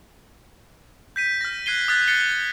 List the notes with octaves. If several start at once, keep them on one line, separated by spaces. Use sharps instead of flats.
G6 B6 D#7
F6 A#6
F#6 G#6 C7 D#7 G7
D#6 F6 F#6 G#6 A6 B6
F#6 A6 A#6 C7 C#7 G7